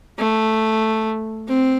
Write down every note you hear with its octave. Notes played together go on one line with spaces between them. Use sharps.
A3
C4